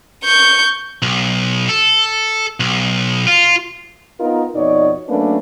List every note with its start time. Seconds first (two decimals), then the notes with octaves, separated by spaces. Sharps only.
0.24 C#6 G6
1.02 B1
1.69 A4
2.60 B1
3.27 F4
4.20 B3 D#4 F4 A#4
4.55 F2 B2 D#4 C#5 D5
5.09 F#3 A3 A#3 C#4 D4 B4